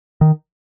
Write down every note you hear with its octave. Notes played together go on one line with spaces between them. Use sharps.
D#3